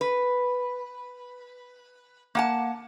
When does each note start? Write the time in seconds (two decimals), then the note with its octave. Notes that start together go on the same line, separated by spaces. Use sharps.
0.01 B4
2.35 A#3 F#5 A5